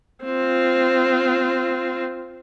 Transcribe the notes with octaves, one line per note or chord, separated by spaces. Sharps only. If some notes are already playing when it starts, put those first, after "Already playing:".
C4 F4